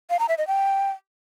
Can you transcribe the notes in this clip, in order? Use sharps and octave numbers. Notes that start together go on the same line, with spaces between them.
F5
A#5
E5
D#5
G5